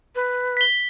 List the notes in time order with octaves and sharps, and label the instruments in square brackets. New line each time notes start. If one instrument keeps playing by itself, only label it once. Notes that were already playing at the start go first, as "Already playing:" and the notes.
[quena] B4
[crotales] B6 G7